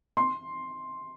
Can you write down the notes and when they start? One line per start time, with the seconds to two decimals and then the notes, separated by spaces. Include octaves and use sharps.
0.17 C6